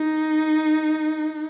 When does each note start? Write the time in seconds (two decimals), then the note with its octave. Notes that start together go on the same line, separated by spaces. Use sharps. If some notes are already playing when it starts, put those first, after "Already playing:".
Already playing: D#4